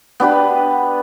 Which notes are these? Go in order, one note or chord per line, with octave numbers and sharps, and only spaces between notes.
B3 D4 G4 B4